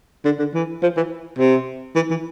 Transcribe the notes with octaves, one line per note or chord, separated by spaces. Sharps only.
D3
D3
E3
F3
E3
C3
E3
E3